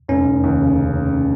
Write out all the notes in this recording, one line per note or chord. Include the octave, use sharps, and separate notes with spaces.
F1 C#4
F1
D#2
C#3